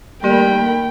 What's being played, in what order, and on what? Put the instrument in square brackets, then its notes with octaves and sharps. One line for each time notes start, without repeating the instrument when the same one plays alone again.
[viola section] D#3 A3 B5 [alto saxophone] G3 [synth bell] A#3 [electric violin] G5